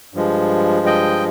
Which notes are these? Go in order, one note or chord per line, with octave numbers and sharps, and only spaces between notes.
G2 F3 G#3
D#5 G5